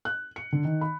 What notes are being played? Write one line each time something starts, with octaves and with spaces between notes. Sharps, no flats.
F#6
C#7
D3
D#3
B5